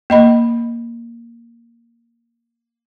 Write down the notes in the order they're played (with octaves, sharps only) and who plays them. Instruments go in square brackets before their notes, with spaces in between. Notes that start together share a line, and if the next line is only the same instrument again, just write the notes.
[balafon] A#3 D#5 B5